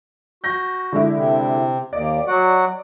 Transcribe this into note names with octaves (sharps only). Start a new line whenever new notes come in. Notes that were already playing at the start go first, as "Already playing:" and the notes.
F#4 G6 A#6
D3 G#3 E4
C3
D#2 D5 D#5
F#3 F#4 F#5